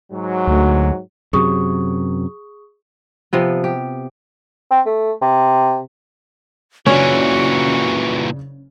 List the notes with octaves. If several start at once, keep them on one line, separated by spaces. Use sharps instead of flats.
G#2 F#3
D2
F#2 C3 F#3 G#4 C#6 D#6
C3 F3 B3
G4
C4
A3
C3
F#1 A#2 C#3 E3 C#4 D4 F#4